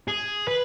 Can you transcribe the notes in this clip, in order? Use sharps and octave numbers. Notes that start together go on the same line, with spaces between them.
G#4
B4